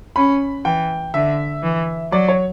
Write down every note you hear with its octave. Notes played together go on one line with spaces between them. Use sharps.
C#4 B5
E3 G5
D3 E5
E3
F#3 D5
C#5